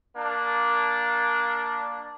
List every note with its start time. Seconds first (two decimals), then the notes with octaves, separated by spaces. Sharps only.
0.16 A#3 D4